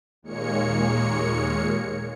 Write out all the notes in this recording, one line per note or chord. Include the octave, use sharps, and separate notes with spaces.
D#2 A#2 G#3 A#3 C#5 C#7